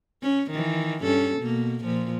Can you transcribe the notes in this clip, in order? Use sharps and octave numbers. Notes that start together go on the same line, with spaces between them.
C#4
D#3 E3
G2 C#4 A4
B2 A#3
A#2 F3